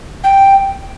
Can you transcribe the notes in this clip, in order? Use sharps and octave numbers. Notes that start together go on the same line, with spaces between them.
G5